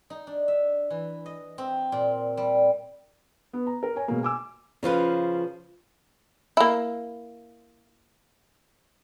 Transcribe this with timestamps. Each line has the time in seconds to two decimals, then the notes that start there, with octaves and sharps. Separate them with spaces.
0.10 D#4
0.27 D4
0.48 E5
0.90 E3
1.26 D#5
1.58 C4
1.92 A#2
2.37 G3
3.53 B3
3.67 A#5
3.83 A#4
3.96 C#5 G#5
4.08 B2 G#3 A#3
4.23 G#5 D6 E6
4.83 C#3 F3 F4 B4
6.57 A#3 E4